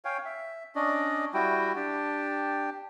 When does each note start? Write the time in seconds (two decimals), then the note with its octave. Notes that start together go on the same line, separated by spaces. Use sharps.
0.05 C#5 F5 G5 G#5
0.25 E5
0.75 C#4 D4 D5 D#5
1.34 G3 E4 F#4 G5
1.76 D4 G4 G5 A5